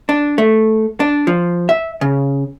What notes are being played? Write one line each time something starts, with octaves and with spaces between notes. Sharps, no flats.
D4
A3
D4
F3
E5
C#3